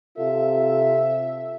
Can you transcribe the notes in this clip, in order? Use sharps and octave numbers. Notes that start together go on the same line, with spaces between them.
C3 F4 A4 E5